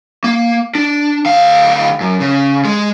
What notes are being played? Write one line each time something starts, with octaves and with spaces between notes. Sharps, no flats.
A#3
D4
D2 F5
F#2
C#3
G#3